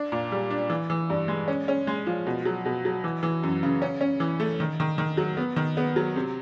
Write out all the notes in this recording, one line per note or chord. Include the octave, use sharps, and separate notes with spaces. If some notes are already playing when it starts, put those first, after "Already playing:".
Already playing: D4
A#2
G3
D4
E3
E3
G2
G#3
C#4
C#4
G#3
F3
B2
F#3
B2
F#3
E3
E3
F#2
C#3
C#4
C#4
E3
A3
D#3
D#3
D#3
F#3
B3
D#3
B3
F#3
C3